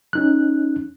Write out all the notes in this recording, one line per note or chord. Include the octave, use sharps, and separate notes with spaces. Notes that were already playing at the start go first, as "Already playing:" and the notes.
C#4 D#4 F#6